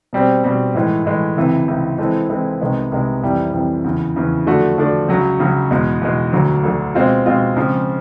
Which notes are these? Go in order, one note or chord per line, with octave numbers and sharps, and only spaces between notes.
B2 G3 C4
B2 G3 C4
A2 E3 G#3
A2 E3 G#3
C#2 C3 E3
C#2 C3 E3
E3 G#3 C4 E4 A4
E3 G#3 C4 E4 A4
C2 C3 D#3 G#3 B3
C2 C3 D#3 G#3 B3
F2 C3 E3 G3
F2 C3 E3 G3
E2 C#3 E3
E2 C#3 E3
D3 F3 A3 D4 F#4
D3 F3 A3 D4 F#4
C#2 C#3 F#3
C#2 C#3 F#3
E2 B2 G#3
E2 B2 G#3
D2 D3 F#3
D2 D3 F#3
B2 G#3 C4 F4
B2 G#3 C4 F4
C#3 F3 G#3 C4